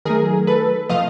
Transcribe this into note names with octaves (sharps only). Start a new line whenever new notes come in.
D#3 F#3 A3 G#4 A#4
A4 B4
C3 F3 A3 D#5 F5